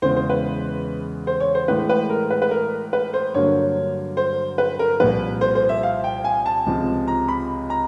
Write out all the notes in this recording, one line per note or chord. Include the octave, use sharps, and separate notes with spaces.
E2 C#3 E3 G#3 C5
C5
B4
C5
C#5
C5
A2 E3 G#3 B4
B4
A#4
B4
B4
A#4
B4
C5
G2 D3 F#3 A#3 C#5
C5
B4
A#4
C2 A#2 F3 B4
C5
C5
E5
F5
G5
G#5
A5
C#2 C3 F3 G#3
A#5
B5
A#5